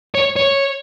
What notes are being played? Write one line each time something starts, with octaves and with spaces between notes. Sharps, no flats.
C#5
C#5